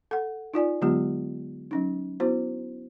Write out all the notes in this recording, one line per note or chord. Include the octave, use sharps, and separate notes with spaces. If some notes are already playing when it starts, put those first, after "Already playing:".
A4 F#5
D#4 F4 D5 G#5
D3 F#3 G#3 B3 F4 G4
F#3 C#4 D#4
B3 E4 F#4 C5